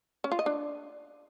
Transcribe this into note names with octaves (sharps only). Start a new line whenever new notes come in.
C#4
F4
D#5
D4